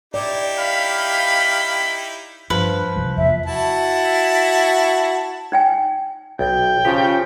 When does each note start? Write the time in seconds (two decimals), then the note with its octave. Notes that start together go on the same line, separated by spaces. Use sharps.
0.14 D#4 E4 G4 D5
0.59 F5 B5
2.50 G2 F3 B4
2.96 C3 E3 G3
3.17 E2 C3 A#3 E5
3.46 E4 F#4 A5
5.52 D#4 G5 G#5
6.39 B1 G5
6.85 C#3 F3 G4 G#5 A5